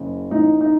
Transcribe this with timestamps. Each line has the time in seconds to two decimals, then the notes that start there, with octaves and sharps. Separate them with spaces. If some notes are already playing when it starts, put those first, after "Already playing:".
Already playing: F#1 C#3
0.31 A1 A2 D#4
0.61 D#4